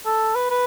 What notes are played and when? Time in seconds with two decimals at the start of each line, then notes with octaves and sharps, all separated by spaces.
0.06 A4
0.35 B4
0.51 B4